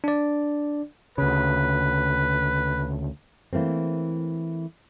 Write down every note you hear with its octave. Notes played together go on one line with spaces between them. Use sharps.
D4 D5
D2 C#3 B4
E3 A3 A#3 C4